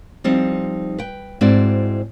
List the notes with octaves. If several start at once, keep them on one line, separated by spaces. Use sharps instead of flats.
F3 G3 C4 D#4
B4 G5
G#2 C4 E4 F#4 D5